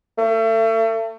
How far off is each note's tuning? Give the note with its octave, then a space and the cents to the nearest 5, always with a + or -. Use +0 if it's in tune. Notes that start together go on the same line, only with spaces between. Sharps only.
A3 +35